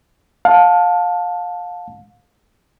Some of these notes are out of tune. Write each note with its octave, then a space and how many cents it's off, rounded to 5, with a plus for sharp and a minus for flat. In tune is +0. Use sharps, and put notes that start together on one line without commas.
F5 +30 A5 +0